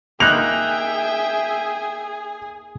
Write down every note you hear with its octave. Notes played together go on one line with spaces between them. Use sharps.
A#3 D#4 G#4 E5 G5 F#6 F7